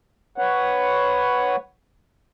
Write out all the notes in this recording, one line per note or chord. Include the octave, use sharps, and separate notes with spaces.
B4 C#5 F#5